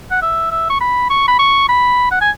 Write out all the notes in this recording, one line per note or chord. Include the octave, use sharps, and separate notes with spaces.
F#5
E5
E5
C#6
B5
C#6
B5
C#6
B5
F#5
G#5